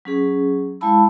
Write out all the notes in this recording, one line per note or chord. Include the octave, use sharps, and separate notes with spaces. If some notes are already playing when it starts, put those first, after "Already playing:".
F#3 C#4 G#4
G#3 E4 F5 A5 B5 E6